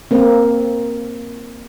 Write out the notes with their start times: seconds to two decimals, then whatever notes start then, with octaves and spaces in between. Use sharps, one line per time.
0.11 A#3 C4